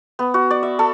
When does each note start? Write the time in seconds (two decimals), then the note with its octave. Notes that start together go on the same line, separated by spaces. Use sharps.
0.19 B3
0.34 F#4
0.50 D5
0.63 E5
0.79 A4